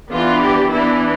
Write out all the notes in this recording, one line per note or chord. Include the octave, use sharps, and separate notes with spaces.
E3 B3 D4 F4
G4
E3 B3 D4 E4